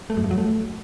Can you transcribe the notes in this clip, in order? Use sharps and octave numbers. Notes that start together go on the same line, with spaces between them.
A3
F#2
G2
F#3
A3